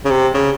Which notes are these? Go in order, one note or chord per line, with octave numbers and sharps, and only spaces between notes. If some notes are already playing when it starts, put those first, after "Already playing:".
C#3
C3
C#3